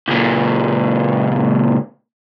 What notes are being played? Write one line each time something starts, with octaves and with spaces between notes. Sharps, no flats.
C#2 A#2